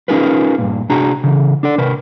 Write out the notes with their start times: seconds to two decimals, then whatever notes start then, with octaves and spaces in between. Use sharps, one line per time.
0.08 C#4 D#4 F4 G#4 A#4 B4
0.58 G2 A#2
0.89 C3 D4 F#4 G#4 A#5
1.24 C#3 E3
1.63 D4 A4 D5
1.78 C3 A#4 B4